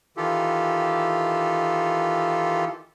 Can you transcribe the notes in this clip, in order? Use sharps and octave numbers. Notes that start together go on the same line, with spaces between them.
D#3 E3 F4 G4 A4